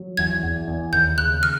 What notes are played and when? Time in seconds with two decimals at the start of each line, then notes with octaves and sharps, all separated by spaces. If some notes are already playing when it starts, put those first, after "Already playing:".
Already playing: F#3
0.17 E2 G#6
0.43 E2
0.68 E2
0.92 D#2 G6
1.18 C#3 F#6
1.43 F6